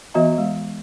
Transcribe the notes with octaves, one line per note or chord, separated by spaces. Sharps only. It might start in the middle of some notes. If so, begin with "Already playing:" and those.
E3 B3 F#4 D#5 E5 A#5
G#3